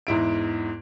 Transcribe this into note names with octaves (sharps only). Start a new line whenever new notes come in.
E2 G#2 E4 D7